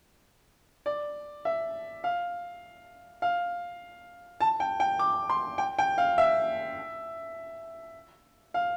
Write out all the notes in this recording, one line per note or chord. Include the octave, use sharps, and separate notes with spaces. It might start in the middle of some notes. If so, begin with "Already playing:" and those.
D5
E5
F5
F5
A5
G5
G5
D6
C6
G5
G5
F5
E5
F5